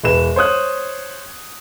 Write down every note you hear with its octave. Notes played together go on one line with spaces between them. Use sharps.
E1 B4 E7
C5 C#5 D#6 F#6